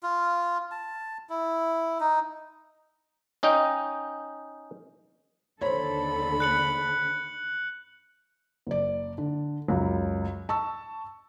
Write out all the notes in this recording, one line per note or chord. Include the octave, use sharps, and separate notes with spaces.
F4
A5
E4
D#4
C#4 D#4 D#5 G5
D#2 D3 A4 C5 C#5 B5
F#6 C#7 F#7
F#1 D5
D3
C#2 F#2
A5 C#6 E6